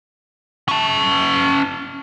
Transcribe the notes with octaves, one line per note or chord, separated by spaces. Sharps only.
C#4 A5